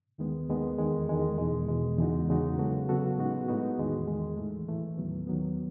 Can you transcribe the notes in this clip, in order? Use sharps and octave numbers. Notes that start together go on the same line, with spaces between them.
D#2 D#3 G#3 B3
D#2 D#3 G#3 B3
E2 D#3 G#3
E2 D#3 G#3
E2 B2 G#3
E2 B2 G#3
E2 C#3 G#3 D#4 F#4
E2 C#3 G#3 D#4 F#4
C#3 F#3 B3 F#4 A4
C#3 F#3 B3 F#4 A4
A2 G#3 B3 D#4 F#4
A2 G#3 B3 D#4 F#4
E2 D#3 G#3
E2 D#3 G#3
A2 E3 A3
A2 E3 A3
D#2 D#3 F#3 B3
D#2 D#3 F#3 B3